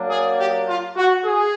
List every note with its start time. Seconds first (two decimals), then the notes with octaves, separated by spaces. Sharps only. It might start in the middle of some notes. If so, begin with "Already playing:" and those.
Already playing: F#3 A#3 D4
0.10 G#4
0.39 G4
0.67 F4
0.96 F#4
1.26 G#4